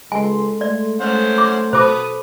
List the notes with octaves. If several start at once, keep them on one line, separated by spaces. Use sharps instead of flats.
C#2 G#3 A4 G#5 C6
A3 D5
A3 C#4 C5 F#5
D6
B2 A4 B4 C5 D6 D#6